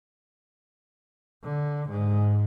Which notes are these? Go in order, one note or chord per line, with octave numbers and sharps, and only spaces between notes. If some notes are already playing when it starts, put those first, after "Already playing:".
D3
G#2